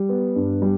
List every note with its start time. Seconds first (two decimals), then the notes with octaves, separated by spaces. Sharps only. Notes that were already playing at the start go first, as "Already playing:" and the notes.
Already playing: G3
0.09 B3
0.36 G2
0.62 G3